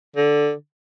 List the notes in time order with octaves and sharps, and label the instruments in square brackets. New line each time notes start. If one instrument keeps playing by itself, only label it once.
[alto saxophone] D3